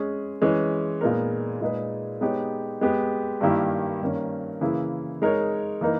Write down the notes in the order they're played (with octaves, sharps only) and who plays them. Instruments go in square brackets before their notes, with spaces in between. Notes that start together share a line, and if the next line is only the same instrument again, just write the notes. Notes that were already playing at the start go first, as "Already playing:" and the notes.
Already playing: [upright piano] G#3 C#4 G#4
E3 G#3 C#4
A#2 G#3 B3 D#4 A#4
A#2 G#3 D#4 G#4 B4
G#3 B3 D#4 G4 C#5
G#3 B3 G4
G2 D#3 A#3 E4 G4
G2 D#3 A#3 C#4
C#3 E3 A#3 E4 G#4
G#3 D#4 A#4 C#5
E3 A#3 D#4 A#4